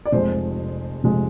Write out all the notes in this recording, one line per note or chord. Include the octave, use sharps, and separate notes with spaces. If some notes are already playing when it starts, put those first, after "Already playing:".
D5
F1 F2 C3 F3 G#3 C5
F1 F2 C3 F3 G#3